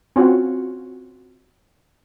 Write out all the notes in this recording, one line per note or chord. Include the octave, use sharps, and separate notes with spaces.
C4 C#4 F4 F#4